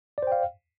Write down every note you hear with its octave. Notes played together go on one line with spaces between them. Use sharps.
C5 D5 F5 G5